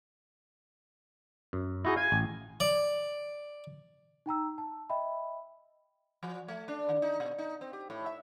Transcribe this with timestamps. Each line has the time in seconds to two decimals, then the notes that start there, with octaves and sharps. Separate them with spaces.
1.53 F#2
1.85 D#4 E4 F#4 G#4
1.96 F5 G#5
2.12 A1
2.60 D5
4.26 D#4 G5 A#5 E6
4.58 A5
4.90 D#5 E5 G5 B5
6.23 F3
6.48 A3
6.68 D4
6.89 D#3
7.02 D#4
7.20 B2
7.38 D#4
7.61 C4
7.73 G4
7.90 A2
8.06 E5